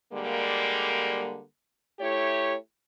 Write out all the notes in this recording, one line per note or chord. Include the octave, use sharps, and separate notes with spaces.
D3 G3 G#3 A#3
A3 E4 G4 C#5